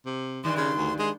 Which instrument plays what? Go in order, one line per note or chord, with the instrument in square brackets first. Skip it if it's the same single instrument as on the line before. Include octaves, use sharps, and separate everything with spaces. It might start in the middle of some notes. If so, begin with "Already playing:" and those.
[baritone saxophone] C3
[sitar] G2 D#3 D4 [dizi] C6
[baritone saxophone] C#3 [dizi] C6
[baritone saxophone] D2
[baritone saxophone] G#3 [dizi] C6